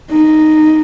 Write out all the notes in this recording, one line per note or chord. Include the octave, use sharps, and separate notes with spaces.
D#4